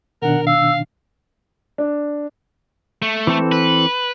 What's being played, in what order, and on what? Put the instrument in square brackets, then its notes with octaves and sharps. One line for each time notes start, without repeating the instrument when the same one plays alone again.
[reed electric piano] B2 D#3 D4 [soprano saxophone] A#4 [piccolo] F#5
[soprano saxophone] F5 [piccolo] E6
[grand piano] D4
[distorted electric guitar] A3
[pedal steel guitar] E3 C4 A4
[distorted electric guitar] B4